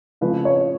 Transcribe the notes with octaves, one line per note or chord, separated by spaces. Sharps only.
C#3 F3 A3 B4
C#5